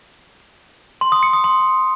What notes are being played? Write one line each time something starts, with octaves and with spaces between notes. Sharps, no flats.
C6
D#6
C#7
D#6
C6